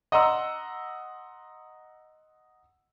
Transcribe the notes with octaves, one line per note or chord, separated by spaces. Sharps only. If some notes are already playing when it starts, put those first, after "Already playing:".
D#5 F#5 A#5 C6 E6